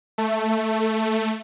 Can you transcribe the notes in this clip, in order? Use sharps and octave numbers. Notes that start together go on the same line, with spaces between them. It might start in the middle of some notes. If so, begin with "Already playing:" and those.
A3